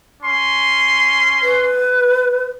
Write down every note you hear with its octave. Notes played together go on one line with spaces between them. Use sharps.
C#4 C6
B4